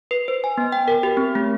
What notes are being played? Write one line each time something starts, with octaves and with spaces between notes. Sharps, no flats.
B4
C5
G#5
B3
G5
A#4
G4
C4
A3